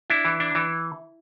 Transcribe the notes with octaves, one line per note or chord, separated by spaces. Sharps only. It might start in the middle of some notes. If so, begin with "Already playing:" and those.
D4 E4
E3
D4
E3